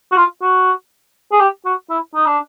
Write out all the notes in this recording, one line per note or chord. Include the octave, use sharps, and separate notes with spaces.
F#4
F4
F#4
G#4
G4
F#4
E4
D#4
D4